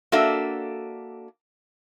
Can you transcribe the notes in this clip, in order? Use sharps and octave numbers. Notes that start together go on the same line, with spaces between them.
A#3 D4 F#4 A4 E5